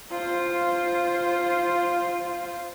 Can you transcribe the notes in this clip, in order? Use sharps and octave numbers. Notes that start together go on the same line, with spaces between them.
F4 C5